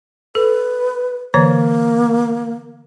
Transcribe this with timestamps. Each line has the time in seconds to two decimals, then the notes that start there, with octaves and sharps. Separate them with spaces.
0.35 A4 B4
1.34 D3 E3 A#3 C#5